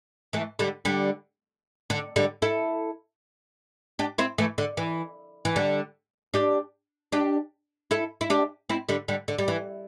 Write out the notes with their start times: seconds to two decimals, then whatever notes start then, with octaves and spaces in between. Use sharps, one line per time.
0.33 E3 A3
0.59 D3 G3
0.85 D3 G3
1.90 D3
2.16 D3 G3
2.42 E4 A4
3.99 D4 G4
4.18 C4 E4
4.38 E3 A3
4.58 D3
4.77 E3
5.45 E3
5.56 D3 G3
6.34 D4 G4
7.12 D4 G4
7.91 E4 A4
8.21 E4
8.30 D4 G4
8.69 C4 E4
8.89 D3 G3
9.08 D3 G3
9.28 D3
9.38 G3
9.48 E3